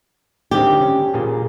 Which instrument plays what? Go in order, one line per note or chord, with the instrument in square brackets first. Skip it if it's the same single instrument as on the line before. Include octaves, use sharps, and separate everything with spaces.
[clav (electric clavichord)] D3 D#3 C4 [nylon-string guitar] G4
[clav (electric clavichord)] C#4
A#2 A#3 G#4